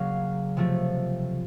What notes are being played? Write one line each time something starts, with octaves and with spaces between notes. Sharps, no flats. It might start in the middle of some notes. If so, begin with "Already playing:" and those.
Already playing: C#3 F#3 A#3 F5
C3 F3 A3